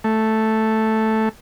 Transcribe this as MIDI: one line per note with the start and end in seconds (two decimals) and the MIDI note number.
0.04 1.29 57